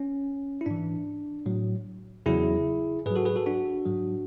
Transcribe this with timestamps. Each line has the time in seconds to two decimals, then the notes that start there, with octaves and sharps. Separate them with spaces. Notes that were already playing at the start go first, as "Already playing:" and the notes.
Already playing: C#4
0.61 E4
0.66 G#2 E3 D4
1.46 A2 F#3
2.26 E2 C#3 F#3 E4 G#4
3.06 G#2 F#3 G#4 B4
3.15 F#4 A4
3.26 G#4 B4
3.36 F#4 A4
3.46 D4 F#4
3.86 G#2 F#3